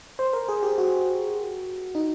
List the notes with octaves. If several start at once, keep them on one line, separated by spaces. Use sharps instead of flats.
C5
A#4
G#4
G4
F#4
D#4